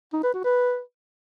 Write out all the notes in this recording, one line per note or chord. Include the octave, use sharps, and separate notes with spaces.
D#4
B4
F#4
B4